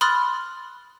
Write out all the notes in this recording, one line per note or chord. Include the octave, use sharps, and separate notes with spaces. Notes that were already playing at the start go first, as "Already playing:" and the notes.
B5 C6 D#6 F6 F#6 A6